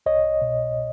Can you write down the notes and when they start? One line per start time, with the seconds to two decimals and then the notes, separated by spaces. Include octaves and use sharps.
0.06 C2 C#5 D#5
0.41 B2